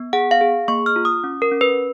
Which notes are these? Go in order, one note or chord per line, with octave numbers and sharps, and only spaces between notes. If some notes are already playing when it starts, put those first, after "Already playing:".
Already playing: B3
G#4 F#5
F5
G#4
A#3 C#6
F6
F4
D#6
C#4
A#4
C#4
B4